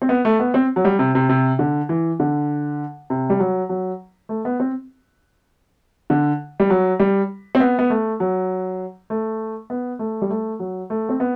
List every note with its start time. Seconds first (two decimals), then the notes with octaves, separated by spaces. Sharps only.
0.02 C4
0.09 B3
0.25 A3
0.40 B3
0.54 C4
0.76 F#3
0.85 G3
0.99 C3
1.15 C3
1.29 C3
1.59 D3
1.89 E3
2.20 D3
3.10 C3
3.30 G3
3.40 F#3
3.69 F#3
4.29 A3
4.45 B3
4.60 C4
6.10 D3
6.60 G3
6.70 F#3
7.00 G3
7.55 C4
7.60 B3
7.79 B3
7.90 A3
8.20 F#3
9.10 A3
9.70 B3
9.99 A3
10.22 G3
10.30 A3
10.59 F#3
10.90 A3
11.09 C4
11.20 B3